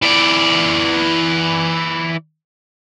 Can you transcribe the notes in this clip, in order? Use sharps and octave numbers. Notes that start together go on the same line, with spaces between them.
E3 D5